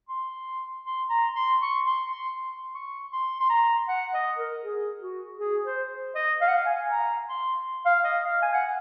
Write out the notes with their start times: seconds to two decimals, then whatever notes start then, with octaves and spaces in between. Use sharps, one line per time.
0.08 C6
0.85 C6
1.10 A#5
1.35 C6
1.61 C#6
1.86 C6
2.12 C6
2.75 C#6
3.12 C6
3.40 C6
3.49 A#5
3.88 F#5
4.14 D#5
4.38 A#4
4.63 G#4
5.01 F#4
5.39 G#4
5.65 C5
6.15 D#5
6.41 F5
6.48 F#5
6.55 F5
6.66 G#5
6.91 A#5
7.29 C6
7.86 F5
8.05 D#5
8.24 F5
8.42 G#5
8.53 F#5